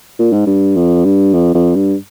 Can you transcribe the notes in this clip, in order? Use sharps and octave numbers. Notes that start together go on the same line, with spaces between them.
A#2
G#2
G2
F2
G2
F2
F2
G2